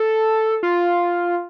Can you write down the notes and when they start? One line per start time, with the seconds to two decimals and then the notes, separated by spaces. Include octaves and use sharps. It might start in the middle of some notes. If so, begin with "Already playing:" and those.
Already playing: A4
0.63 F4